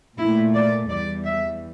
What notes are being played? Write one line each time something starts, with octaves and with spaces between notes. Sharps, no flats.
A#2 A3 E4
D5
E2 E3 G3 D5
E5